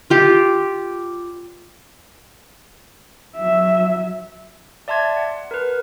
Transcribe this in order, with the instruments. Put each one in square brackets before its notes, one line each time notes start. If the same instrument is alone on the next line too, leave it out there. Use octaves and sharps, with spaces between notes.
[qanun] F4 G4
[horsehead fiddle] F#3 E5
[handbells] D5 E5 A5 C6 G#6
F#5
A#4 B4